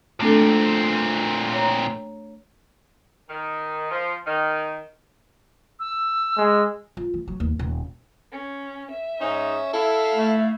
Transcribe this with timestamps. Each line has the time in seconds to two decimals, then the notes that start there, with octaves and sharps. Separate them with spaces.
0.20 A#2 A3 C4 D4 A4
1.53 C#5 A#5
3.29 D#3
3.91 F3
4.27 D#3
5.80 E6
6.37 G#3
6.97 F4
7.14 E3
7.28 F#3
7.40 D#2
7.59 D#1
8.32 C#4
8.92 E5
9.21 G#2 C#4 D#4
9.74 E4 A4 E5 F5
10.14 A3